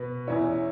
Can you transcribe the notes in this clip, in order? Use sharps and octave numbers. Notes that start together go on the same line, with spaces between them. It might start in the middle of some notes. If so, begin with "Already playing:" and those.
Already playing: B2 B3 B4
E2 E3 C#4 E4 C#5